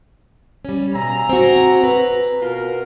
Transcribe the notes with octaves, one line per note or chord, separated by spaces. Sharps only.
G3 C#4
B2 G#4 E5 A#5
C4 F#4
B4
B2 F4 A#4